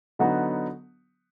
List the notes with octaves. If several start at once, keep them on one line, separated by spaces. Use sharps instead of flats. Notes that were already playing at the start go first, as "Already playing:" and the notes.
D3 F#3 B3 D#4 F#4